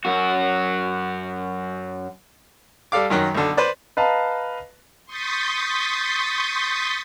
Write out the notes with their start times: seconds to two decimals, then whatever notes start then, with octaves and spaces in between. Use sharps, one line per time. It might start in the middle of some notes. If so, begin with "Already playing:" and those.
0.05 F#2 F#4
2.92 G3 A4 F5 D6
3.10 F#2 D#3 F#3
3.34 B1 D3
3.57 B4 C5 D5
3.97 B4 D#5 F5 A5 A#5
5.06 C6 C#6 D#6 G6 A6 B6